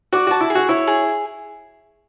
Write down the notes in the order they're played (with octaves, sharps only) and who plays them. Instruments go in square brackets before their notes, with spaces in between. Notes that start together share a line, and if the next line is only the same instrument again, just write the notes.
[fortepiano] F#4 [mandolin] D5
[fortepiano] F#4 [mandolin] A5
[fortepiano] E4
[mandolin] G#4
[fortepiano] F#4
[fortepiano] E4 [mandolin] C#5
[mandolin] G#4